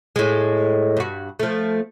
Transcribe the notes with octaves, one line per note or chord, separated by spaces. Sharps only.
A2 G#3
G2 F#4
F3 A3